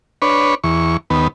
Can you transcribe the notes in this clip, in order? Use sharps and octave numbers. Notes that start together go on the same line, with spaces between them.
D4 B4 C#5
E2 C#6
D#2 B3